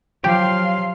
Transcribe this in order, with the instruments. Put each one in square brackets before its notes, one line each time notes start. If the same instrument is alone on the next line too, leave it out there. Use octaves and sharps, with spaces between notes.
[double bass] F3 [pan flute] F#3 [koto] G4 [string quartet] F5 C6